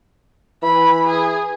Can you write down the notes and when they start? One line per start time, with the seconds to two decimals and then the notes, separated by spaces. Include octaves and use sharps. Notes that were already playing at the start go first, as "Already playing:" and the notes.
0.63 E3 B5
1.07 G#4